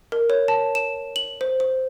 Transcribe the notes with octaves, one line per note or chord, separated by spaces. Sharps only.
A#4
C#5
A5
E7
F#7
C5
C5